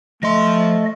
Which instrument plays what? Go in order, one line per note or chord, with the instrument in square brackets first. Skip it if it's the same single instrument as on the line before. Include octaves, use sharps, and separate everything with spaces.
[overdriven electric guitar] F3 C6 [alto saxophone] A3 [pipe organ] D#5